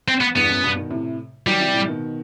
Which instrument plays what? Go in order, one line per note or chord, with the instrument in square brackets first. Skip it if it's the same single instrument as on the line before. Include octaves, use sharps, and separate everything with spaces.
[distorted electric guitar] C4
B3
[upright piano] E2 G2 [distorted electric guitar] B3
[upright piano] F#2 A2
G2 B2
B2 D#3
A2 C3
[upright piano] D#3 F#3 [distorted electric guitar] G3
[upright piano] C3 E3
A2 C3
B2 D#3